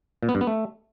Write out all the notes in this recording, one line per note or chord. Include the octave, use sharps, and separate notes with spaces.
A#2
B3
G2
B3
A3